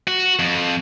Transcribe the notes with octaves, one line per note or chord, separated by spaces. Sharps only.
F#4
F2